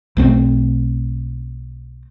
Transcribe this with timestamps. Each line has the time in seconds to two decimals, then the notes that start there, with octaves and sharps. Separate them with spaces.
0.17 B1 A3 C4